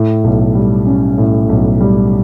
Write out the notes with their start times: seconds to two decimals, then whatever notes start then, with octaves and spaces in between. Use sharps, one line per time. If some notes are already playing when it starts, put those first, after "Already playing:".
Already playing: A2
0.24 B1
0.55 G3
0.86 C#4
1.18 A2
1.49 B1
1.81 G3